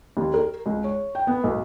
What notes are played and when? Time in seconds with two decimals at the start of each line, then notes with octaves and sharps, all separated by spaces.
0.17 D#2
0.34 A#4
0.66 C#2
0.84 C#5
1.15 G5
1.27 B3
1.44 B1